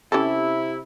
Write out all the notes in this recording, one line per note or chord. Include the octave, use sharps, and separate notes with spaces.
C3 C#4 E4 G4 A4